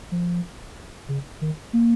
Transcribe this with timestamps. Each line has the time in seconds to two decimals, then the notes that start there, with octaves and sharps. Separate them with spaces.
0.12 F3
1.09 C#3
1.41 D#3
1.73 A#3